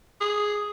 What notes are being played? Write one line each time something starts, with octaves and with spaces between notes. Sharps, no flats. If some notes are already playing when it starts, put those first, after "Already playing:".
G#4